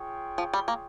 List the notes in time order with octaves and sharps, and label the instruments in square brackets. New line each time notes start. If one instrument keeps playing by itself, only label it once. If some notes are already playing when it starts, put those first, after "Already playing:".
Already playing: [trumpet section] F4 G#4 C#5 G5
[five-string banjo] F3
G3
A#3